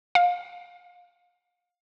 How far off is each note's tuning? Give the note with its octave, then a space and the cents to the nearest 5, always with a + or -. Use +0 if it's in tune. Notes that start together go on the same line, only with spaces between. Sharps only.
F5 +30